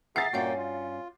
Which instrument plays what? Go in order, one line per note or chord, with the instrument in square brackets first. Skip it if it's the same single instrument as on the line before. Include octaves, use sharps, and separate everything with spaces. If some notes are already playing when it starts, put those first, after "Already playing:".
[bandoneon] G#4 E5 A#5 [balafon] F#5 [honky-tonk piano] A6 C7
[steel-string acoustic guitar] G2 C#4 [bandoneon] A#2 A#3 G5 [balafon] F#4 E5 F#5
[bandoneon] F4